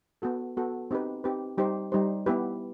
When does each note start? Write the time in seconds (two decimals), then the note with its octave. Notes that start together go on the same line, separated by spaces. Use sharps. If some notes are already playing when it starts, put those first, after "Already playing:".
0.22 B3 F#4 A4
0.57 B3 F#4 A4
0.91 C4 D#4 G4 B4
1.24 C4 D#4 G4 B4
1.58 G3 D#4 G4 C5
1.92 G3 D#4 G4 C5
2.26 B3 E4 G4 B4